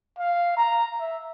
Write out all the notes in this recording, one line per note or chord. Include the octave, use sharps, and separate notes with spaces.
F5
A#5
E5